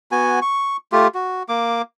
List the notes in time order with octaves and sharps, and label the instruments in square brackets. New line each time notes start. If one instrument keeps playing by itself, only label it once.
[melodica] B3 F#4 G#5
C#6
A3 F4 G4
F#4
A#3 D6